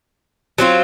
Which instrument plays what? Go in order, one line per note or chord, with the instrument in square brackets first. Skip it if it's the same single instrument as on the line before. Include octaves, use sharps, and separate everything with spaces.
[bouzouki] F#3 C4 F4